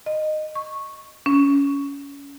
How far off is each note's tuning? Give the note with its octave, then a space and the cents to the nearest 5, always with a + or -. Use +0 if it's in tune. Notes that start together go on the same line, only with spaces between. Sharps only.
D#5 -15
C#6 -10
C#4 +25